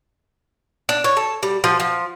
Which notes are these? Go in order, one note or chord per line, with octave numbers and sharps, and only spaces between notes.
D4
C#5
A4
G3
F3
F3